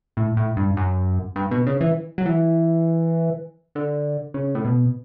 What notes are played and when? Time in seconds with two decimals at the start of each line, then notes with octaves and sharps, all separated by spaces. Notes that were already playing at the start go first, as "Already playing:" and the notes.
0.17 A2
0.37 A2
0.57 G2
0.77 F#2
1.36 G2
1.51 B2
1.67 C#3
1.81 E3
2.18 F#3
2.26 E3
3.75 D3
4.34 C#3
4.55 A2
4.65 B2